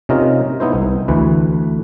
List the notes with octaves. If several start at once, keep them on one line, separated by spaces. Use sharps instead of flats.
C3 C#4 D#4 F4 A#4 D#5
B3 D#4 E4 C5
C2
D2 E3 B4